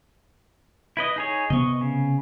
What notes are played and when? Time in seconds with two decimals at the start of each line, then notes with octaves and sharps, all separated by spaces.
0.97 E4 B4 D#5
1.16 D#4 G#4 C#5
1.50 C3 B3 D#5 C#6
1.81 C#3